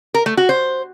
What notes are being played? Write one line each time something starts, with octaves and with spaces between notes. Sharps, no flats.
A#4
A3
F#4
C5